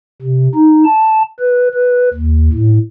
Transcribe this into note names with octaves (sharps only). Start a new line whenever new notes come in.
C3
D#4
A5
B4
B4
D#2
A2